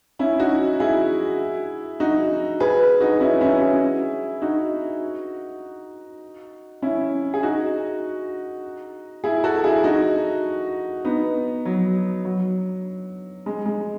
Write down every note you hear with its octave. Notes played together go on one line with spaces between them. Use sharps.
C#4 E4
D#4 F#4
E4 G#4
D#4 F#4
G#4 B4
D#4 F#4
C#4 E4
C#4 E4
E4 G#4
D#4 F#4
C#4 E4
G#4
D#4 F#4
E4 G#4
F#4 A4
E4 G#4
D#4 F#4
B3 D#4
F#3
F#3
G#3
G#3